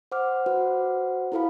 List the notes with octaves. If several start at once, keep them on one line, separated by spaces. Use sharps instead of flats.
C5 F#5 D6 F6
F#4 B4 C5 F#5
E4 F4 A4 B4 F5 B5